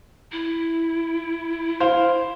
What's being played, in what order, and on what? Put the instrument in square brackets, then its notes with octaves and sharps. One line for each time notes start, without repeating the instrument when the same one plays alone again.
[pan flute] E4
[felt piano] C5 F5